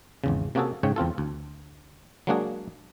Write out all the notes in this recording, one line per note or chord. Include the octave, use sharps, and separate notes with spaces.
G#1 E2 C#3
C3 A#3 C#4 F#4 G#4 A4
G#2 C#3 C#5 G5
E2 C4 F4 A4
D2
F#3 G#3 A#3 D4 F#4 G#4